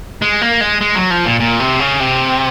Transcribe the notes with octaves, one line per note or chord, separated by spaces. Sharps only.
G#3
A#3
G#3
G#3
F#3
F3
A#2
A#2
C3
C#3
C3